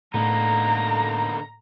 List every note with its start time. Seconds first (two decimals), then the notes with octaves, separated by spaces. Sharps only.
0.14 A2 D3 A#3 B3 D#4 A#5